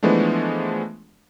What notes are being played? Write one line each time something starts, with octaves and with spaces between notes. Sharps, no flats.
E3 F3 G#3 A3 B3 D4